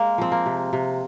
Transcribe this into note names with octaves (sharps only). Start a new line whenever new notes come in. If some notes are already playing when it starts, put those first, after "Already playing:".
Already playing: G#3 A#3
F3 C4
A#3
C3
C3